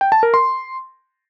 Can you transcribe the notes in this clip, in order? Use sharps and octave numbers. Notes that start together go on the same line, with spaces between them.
G5
A5
A#4
C6